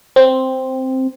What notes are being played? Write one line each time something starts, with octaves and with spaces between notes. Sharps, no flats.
C4